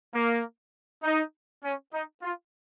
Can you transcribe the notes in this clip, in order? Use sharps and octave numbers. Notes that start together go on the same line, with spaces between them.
A#3
D#4
C#4
D#4
F4